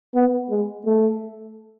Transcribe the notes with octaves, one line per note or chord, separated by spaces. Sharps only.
B3
G#3
A3